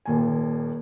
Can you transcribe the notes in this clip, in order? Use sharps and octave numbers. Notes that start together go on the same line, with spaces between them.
D#1 D#2 G#5